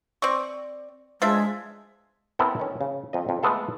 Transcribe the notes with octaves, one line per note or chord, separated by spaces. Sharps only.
C4 D5 C#6
F3 G#3 D4 E5
B3 C4 E4 A4 A#4
D#3 C#4
C#3
F2 D#5
F2
G#3 A3 B3 A4 F5